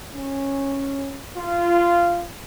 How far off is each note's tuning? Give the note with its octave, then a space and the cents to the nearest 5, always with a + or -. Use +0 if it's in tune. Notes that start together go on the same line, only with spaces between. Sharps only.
C#4 -10
F4 -15